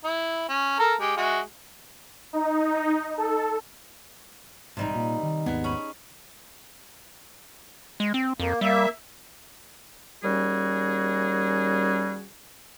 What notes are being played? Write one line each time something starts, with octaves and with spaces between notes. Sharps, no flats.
E4
C#4
A4 A#4 A5
G#3 G4
G#3 F#4 E5
D#4
A4
A1 G#2 C3 G3 D#4
A#2
D#3
G#1 D#2 B3 G#4
C#4 B5
G#3
C4
F2 A#3
G3 A#3 E5
D#2 G3 C#4 F#4 G#4